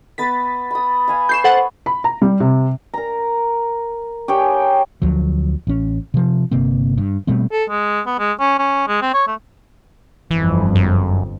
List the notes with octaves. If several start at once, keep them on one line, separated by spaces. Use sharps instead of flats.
B3 B4 D#6 A6 B6
B5 D#6
F5 G#5 B5
B4 C#6 G6 C7 E7
A4 C5 F#5
B5
A#5
G3
C3
A#4 A#5
G4 G#4 C#5 G5
D2 F3 F#3
A1 C#4
C3 F3
G1 C3 A#3 C4
G2
B2 G3 A3 C4
A4
G#3
B3
G#3
C#4
C#4
G#3
C4
C#5
A3
G1 F2 E3
F#2